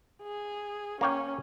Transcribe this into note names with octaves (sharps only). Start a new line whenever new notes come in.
G#4
A#3 C#4 C#5 G5